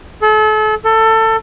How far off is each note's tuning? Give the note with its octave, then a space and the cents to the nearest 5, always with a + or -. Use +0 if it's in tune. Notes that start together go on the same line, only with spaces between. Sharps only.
A4 -35
A4 +20